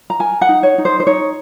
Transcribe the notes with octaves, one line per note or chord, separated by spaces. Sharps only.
A#5
A#4 G#5
F#5
D#4
C#5
D#4
C5
C5
D#4 C#5